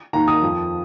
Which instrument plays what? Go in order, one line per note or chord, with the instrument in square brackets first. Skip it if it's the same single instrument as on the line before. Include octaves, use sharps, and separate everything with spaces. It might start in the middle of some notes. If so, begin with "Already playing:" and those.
[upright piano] D#2 D#3 A#5
D#6
F2 F3